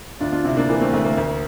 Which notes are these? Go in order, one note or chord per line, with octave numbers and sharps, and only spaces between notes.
D2 D4 F4
D4 F4
C3 C4 E4
A#3 D4
E3 A#3
A3 C4
D2 A3
A#3
D2 A#3